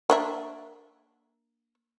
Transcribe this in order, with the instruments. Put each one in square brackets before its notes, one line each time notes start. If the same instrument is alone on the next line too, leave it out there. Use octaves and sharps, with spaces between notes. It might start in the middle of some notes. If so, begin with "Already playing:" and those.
[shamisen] A#3 D4 E5